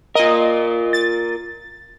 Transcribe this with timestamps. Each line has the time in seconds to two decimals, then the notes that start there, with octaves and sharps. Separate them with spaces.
0.15 F4 A#4 D#5
0.93 A6